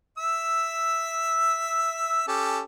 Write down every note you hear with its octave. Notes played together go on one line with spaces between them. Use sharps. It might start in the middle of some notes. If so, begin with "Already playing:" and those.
E5 E6
C#4 G4 A4